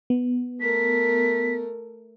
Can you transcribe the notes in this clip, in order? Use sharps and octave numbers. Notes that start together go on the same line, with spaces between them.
B3
A3 A#4 B6